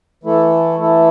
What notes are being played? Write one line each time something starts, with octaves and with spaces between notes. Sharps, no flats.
E3 A3 E4 A4
E3 A3 E4 A4